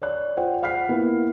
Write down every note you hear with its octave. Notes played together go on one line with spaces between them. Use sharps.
C#5 D5 F#6
F4 C5 F#5 G5
F5 F#5 F6 B6 C7
A#3 B3 E4